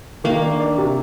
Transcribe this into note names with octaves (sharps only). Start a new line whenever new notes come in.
D#3 A#3
D4
D4
C3